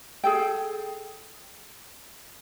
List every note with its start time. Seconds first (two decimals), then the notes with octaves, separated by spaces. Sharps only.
0.24 G#4 A4 G5